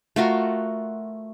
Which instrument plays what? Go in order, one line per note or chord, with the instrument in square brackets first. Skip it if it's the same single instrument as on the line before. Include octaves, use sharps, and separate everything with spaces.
[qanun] A3 F4 F#4 A#4